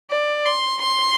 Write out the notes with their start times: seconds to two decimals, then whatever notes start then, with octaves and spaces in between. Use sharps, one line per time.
0.10 D5
0.46 C6
0.81 C6